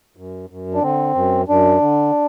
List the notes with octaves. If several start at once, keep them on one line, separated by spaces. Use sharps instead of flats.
F#2
F#2
D4
D3 C4
F#2
F#2 D4
D3